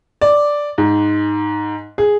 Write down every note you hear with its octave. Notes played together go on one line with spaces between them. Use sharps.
D5
G#2
G#4